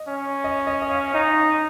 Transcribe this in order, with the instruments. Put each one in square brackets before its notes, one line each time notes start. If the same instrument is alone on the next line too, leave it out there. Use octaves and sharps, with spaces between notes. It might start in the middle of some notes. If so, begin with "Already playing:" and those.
Already playing: [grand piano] D#5
[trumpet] C#4
[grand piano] D#5
D#5
D#5
F5
[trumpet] D#4 [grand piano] D#5